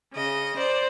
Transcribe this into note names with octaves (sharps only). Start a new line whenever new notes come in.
C#3 D#5
C5 D5